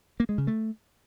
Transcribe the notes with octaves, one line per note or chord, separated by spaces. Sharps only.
A#3
G#3
C#3
A3